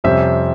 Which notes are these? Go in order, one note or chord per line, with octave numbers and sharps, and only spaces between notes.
F2 C3 G3 C#4 C5 E5